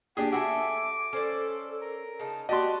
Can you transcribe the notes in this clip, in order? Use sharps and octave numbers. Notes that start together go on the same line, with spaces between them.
D4 G4 G#4 G5
F#4 A4 B4 E5 G#5 D6
C#4 A4 C5 D5
A#4
C#3 D#4 A5
F#4 G4 D5 D#5 A5 C6